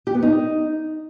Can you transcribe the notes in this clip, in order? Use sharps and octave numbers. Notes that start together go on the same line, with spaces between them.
G4
B3
D#4